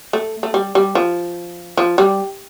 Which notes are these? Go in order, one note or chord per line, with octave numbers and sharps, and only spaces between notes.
A3
A3
G3
G3
F3
F3
G3